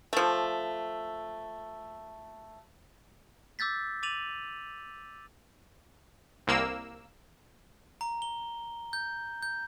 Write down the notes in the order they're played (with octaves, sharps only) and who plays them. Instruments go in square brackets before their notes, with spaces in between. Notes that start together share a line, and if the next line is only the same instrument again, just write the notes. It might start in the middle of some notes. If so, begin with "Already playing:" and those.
[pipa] F3 A3
[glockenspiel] D6 E6 G6 A6 B6
D6 A6 D#7 F7 F#7
[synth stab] C2 A#3 E6
[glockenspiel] A#5
G7
G6
G6